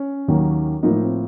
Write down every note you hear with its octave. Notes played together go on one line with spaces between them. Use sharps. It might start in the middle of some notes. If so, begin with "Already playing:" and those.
Already playing: C#4
D#2 D#3 F#3 A#3
A2 F3 A#3 D#4
C4